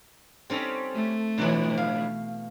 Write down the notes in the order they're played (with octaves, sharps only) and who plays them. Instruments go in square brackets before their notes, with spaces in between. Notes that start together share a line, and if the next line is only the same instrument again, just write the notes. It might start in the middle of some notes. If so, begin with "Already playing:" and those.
[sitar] G3 C#4 [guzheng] C4 D#4 A4
[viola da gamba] A3
[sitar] G#2 F3 D4 [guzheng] B2 E3
[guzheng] F5